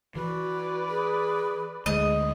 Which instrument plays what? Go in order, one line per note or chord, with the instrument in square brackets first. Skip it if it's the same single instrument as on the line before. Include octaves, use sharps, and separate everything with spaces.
[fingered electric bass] E3 [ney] F#4 [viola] B4 D5
[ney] G#4
[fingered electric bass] D2 G#3 [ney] G#4 [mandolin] D#5